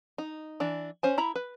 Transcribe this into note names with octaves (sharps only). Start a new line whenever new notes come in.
D#4
E3 D4
C#4 C5 G#5
E4 A#5 B5
B4